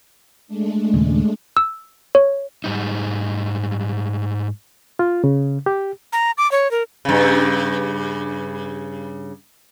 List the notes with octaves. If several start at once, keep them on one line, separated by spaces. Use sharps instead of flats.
G#3 A3 D4
D#2 A#2 C#3
E6
C#5
G#2 G3 D#4
F4
C#3
G4
A#5
D6
C#5
A#4
G2 C#3